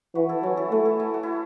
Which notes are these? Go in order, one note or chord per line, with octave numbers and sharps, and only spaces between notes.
E3 F#4 B4
E4 A4
F#3 C#4 F#4
E4 A4
A3 F#4 B4
E4 A4
E4 A4
F#4
E4